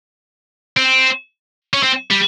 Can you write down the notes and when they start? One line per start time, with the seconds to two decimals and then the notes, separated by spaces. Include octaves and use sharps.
0.77 C4
1.74 C#4
1.83 C4
2.11 G3